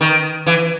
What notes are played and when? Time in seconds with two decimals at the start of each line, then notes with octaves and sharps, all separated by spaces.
0.01 D#3
0.46 E3